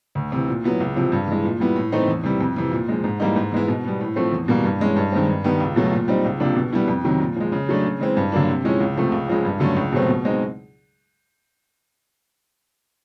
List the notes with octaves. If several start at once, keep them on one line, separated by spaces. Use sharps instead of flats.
D2
C3 E3
A#2
F#3 B3 E4
C#2
C3 F3
G2
E3 G#3
A#2
G3 B3 E4
A2
E3 A3 C4 D#4
E2
C3 E3 G3
F2
C3 E3
A#2
F3 G#3
G#2
E3 G3 A#3 D#4
G#2
E3 G#3 B3 E4
B2
G3 B3
A2
F3 A3 C4
E2
B2 G3 A#3
G2
E3 G#3 C#4
G2
D#3 G#3 C4
G2
D#3 G3 B3
C#2
B2 F#3 A3
A#2
G3 C4 D#4
C#2
C3 F3 A#3 D4
B2
G3 B3 E4
F2
C3 D#3 F#3
A#2
F3 G#3
C#3
F#3 A3 D4
C#3
E3 G#3 C4
G2
D3 F#3 A#3 D4
C3
F3 G#3 C#4 E4
C#2
C3 F3 A3
C#2
C#3 F3 G#3
G2
D3 F#3 A3 C#4
C#2
B2 F#3 A3 C4
B2
G#3 C4 D#4